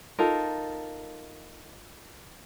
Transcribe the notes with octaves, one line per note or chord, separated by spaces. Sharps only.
D#4 F4 A4 A#4